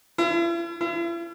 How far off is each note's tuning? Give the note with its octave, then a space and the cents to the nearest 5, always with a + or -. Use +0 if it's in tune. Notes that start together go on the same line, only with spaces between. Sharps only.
E4 +45
E4 +45